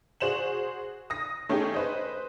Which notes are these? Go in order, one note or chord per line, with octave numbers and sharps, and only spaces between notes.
F#4 G#4 C5 E7 F#7
D#6 A#6
A3 C#4 D#4 G4 G#4
B4 C5 D#5